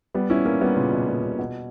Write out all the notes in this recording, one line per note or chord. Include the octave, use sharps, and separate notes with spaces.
G3 B3
C#4 E4
A#3 C#4
G3 B3
A#2 C#3
B2
A#2
A#2 C#3
B2